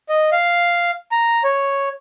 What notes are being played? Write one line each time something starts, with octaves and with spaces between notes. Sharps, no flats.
D#5
F5
A#5
C#5